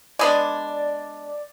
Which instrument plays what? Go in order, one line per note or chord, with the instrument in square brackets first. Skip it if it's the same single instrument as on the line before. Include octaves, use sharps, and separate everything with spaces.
[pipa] G#3 B3 D4 [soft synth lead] D5